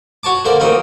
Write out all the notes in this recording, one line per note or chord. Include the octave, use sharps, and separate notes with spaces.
F#4 C#5 A5 D6
D3 A#3 C5 D5
A1 D2 A#3 C4 D#4